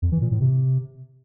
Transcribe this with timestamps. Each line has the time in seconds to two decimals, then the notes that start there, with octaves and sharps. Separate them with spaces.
0.02 F2
0.12 E3
0.21 A#2
0.31 A2
0.41 C3